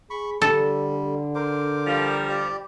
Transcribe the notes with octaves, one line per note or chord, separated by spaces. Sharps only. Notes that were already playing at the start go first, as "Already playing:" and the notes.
G#4 B5 C#6
D3 G3 A4
A#4 C5 D6
F3 G3
G4 D5